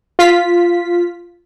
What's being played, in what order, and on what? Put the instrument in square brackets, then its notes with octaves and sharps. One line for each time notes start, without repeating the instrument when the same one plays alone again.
[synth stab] F4 B6